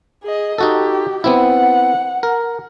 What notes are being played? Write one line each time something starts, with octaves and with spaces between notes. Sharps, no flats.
G#4 D#5
D#4 F#4 G4 A4
B3 C4 E4 F#5
A#4